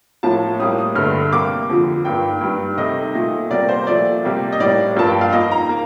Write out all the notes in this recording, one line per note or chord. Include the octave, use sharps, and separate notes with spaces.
A2 F3 A#3 A5
A2 G3 A#3 D#6
D#6
G2 D3 A3 F6
C3 G3 A#3 D6
F2 D3 F3
G2 D#3 A#3 G5
G2 D#3 G3
C3 D#3 A3 D#5
A#2 A3
C3 G3 A#3 D5
C5
A#2 F3 A3 D5
C3 G3 A#3
D#5
A2 G3 A#3 D5
G2 F3 A#3 A5
G5
F5
F2 D#3 A#3 D#5
A#5
A#3